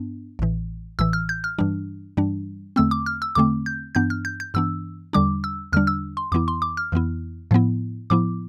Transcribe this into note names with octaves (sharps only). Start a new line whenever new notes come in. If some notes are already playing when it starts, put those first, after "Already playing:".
Already playing: G2 B3 D4
A1 A2 E3
A1 A2 E3 E6
F6
G6
F6
G2 E3 G3 D4
G2 E3 G3 D4
E2 D3 A3 C4 E6
D6
F6
E6
E2 D3 A3 C4 D6
G6
G2 E3 B3 D4 G6
F6
G6
G6
G2 E3 B3 D4 E6
E2 D3 G3 D4 D6
E6
E2 D3 G3 D4 F6
E6
C6
F2 E3 B3 E4 D6
C6
D6
F6
F2 E3 B3 E4
A2 F3 B3 E4
A2 F3 B3 E4 D6